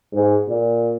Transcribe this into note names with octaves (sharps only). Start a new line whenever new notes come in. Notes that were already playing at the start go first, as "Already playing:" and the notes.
G#2
A#2